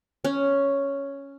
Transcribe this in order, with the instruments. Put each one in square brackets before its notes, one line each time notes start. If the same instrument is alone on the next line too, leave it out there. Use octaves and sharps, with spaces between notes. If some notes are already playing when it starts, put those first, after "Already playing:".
[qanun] C#4